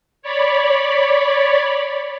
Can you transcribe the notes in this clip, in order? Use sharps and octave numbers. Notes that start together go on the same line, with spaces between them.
C#5 D5 B5